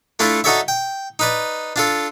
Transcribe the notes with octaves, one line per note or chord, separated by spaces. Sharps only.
A3 D4 E4 F4 A4
D#4 F#4 A4 C#5 D5 E5
G5
D#4 B4 D5
D4 F4 A4